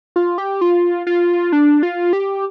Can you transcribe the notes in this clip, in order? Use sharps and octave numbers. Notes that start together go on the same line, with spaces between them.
F4
G4
F4
F4
D4
F4
G4